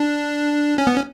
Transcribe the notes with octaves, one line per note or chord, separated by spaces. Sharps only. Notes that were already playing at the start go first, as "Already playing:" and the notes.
Already playing: D4
C#4
B3
C#4